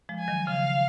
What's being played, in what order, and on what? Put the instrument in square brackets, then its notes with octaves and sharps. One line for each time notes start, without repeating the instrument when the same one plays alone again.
[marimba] F3 G#3
[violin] G#5
[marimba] D#3 F#3
[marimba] C#3 F3 [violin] F5